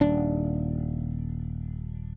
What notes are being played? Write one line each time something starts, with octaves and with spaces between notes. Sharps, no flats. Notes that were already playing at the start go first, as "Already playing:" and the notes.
D#1 D4